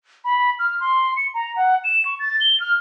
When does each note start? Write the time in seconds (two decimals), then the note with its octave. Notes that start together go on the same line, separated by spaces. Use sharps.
0.25 B5
0.59 F6
0.80 C6
1.17 C#7
1.34 A#5
1.56 F#5
1.84 E7
2.05 C#6
2.20 A6
2.41 G7
2.60 F6